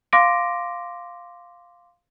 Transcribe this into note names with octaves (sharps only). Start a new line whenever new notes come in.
F5 C6 D6 A#6 D7